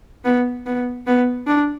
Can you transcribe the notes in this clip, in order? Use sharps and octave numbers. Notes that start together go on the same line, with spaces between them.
B3
B3
B3
D4